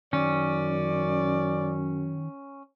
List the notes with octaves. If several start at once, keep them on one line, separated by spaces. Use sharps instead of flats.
F#2 D#3 C#4 D5